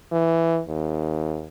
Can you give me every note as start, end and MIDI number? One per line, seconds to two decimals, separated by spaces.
0.12 0.60 52
0.68 1.47 39